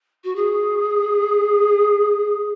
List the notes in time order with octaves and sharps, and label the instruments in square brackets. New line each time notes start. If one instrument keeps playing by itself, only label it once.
[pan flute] F#4
G#4